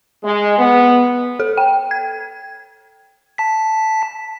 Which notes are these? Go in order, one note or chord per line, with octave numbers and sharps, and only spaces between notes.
G#3
B3
A4
G5
G#6
A5 B6